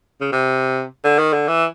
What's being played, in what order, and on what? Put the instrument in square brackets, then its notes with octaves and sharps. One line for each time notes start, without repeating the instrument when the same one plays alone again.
[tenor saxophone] C#3
C3
D3
D#3
D3
E3